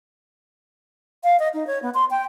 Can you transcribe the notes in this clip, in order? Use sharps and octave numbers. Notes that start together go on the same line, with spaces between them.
F5
D#5
D#4
C#5
B3
C6
G5